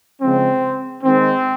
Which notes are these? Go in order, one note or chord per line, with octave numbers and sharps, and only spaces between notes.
C#3 F3 G#3 C4
D#3 G#3 C4